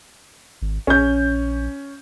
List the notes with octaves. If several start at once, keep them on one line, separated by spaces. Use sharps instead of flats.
G#1
A#1 C#4 G6